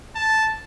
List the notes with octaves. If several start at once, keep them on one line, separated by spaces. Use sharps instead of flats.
A5